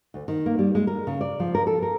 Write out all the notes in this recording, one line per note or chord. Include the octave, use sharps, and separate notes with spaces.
D2
D#3
A#3
G3
G#3
A#4
C#3
D5
F3
A#4
A4
A#4